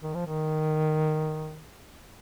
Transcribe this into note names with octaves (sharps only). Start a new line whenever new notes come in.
D#3
F3
D#3